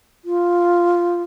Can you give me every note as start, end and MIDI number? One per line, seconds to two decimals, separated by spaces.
0.25 1.22 65